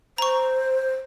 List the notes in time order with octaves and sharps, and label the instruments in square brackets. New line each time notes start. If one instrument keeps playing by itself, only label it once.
[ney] C5 [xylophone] A#5 C#6